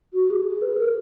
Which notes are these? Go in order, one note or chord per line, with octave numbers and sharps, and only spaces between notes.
F#4
G#4
G#4
B4
A#4